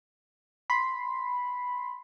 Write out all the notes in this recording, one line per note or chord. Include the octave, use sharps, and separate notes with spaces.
B5 C6